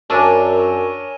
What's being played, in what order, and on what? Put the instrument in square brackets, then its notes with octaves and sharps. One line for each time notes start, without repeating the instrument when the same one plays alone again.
[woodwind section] F#2 [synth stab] D4 [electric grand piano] A#4 C#5 G#5 [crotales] C#6 E6 D#7